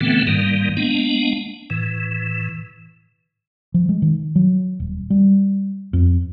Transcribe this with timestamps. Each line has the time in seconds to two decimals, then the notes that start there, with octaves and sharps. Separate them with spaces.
0.01 A#2 D3 E3 A3 B3 C4
0.27 G#2 D#3 G3 A#3
0.77 G#3 A#3 B3 D4
1.70 A2 E3
3.74 F3
3.89 G#3
4.02 D#3
4.36 F#3
4.80 D#1
5.10 G3
5.93 F2